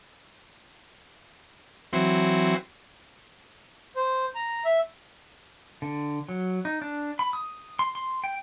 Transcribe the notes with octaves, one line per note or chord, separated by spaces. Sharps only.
E3 F#3 C4
C5
A#5
E5
D3
F#3
D#4
D4
B5
D#6
C6
C6
G5